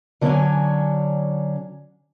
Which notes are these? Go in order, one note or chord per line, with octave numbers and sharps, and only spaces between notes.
D3 F#3 C#4 D4 C#5 G#5